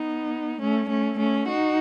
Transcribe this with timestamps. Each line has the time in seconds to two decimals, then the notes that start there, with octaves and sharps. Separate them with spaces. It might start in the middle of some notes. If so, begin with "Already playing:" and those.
Already playing: B3 D#4
0.61 A3 C#4
0.89 A3 C#4
1.19 A3 C#4
1.48 D#4 F#4